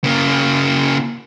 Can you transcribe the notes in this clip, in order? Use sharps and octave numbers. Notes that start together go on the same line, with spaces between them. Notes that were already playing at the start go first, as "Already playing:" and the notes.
C#3 A#3